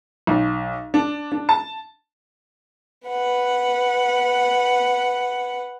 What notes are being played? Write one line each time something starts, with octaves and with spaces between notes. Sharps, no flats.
B1
D4
D4
A5
B4 F#5